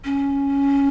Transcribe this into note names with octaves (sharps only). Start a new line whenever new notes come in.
C#4